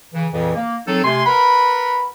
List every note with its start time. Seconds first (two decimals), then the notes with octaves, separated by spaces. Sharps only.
0.14 C#3 E3
0.32 F2 A#2 C#3 E3
0.54 A#3
0.87 F#3 C4 D#4 A4
1.04 C3 A3 G#5 C6
1.26 A#4 B4 F#5 B5